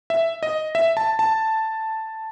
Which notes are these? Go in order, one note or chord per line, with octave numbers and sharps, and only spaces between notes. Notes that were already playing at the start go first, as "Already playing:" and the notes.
E5
D#5
E5
A5
A5